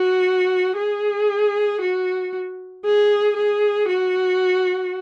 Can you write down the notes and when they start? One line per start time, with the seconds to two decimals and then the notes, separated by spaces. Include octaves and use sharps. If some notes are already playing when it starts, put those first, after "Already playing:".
Already playing: F#4
0.77 G#4
1.81 F#4
2.85 G#4
3.36 G#4
3.88 F#4